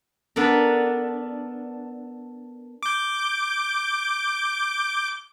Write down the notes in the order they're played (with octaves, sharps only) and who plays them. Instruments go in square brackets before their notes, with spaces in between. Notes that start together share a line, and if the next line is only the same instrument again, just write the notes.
[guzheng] B3 D4 A4 A#4
[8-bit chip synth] D6 G6